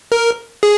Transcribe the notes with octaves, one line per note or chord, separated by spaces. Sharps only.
A#4
G#4